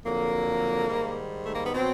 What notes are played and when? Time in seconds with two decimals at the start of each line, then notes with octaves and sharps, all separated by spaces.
0.05 F2 D3 F#3 A#3
0.89 G#2 D#3 G3
1.45 A3
1.55 A#3
1.64 B3
1.74 B2 F#3 C4